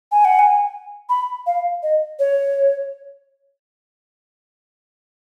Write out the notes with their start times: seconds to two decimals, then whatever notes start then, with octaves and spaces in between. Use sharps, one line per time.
0.12 G#5
0.25 F#5
0.39 G#5
1.09 B5
1.47 F5
1.83 D#5
2.19 C#5